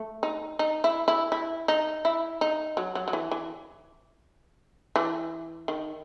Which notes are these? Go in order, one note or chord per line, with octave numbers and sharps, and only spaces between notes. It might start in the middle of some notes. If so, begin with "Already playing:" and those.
Already playing: A3
D#4
D#4
E4
E4
E4
D#4
E4
D#4
F#3
F#3
F#3
E3
E3
E3
D#3